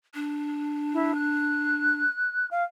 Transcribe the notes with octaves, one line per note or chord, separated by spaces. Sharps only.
D4
E4
F#6
F5